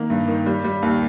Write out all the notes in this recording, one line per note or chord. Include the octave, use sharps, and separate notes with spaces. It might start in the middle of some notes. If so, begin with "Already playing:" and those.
Already playing: D#3 A#3
G2
D#3
G3
G3
D#2